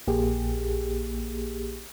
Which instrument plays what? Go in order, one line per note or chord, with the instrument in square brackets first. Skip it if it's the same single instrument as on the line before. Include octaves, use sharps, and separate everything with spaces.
[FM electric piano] A#1 A#3 G4 G#4